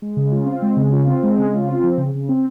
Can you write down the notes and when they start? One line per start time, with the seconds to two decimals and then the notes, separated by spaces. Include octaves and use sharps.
0.02 G#3
0.17 C#3
0.32 F4
0.46 C4
0.62 G#3
0.77 C#3
0.93 F4
1.07 C4
1.23 G#3
1.38 C#3
1.53 F4
1.68 C4
1.83 F3
1.98 C#3
2.14 C#3
2.29 C4